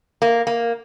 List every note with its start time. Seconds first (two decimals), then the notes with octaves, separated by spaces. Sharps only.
0.22 A#3
0.47 A#3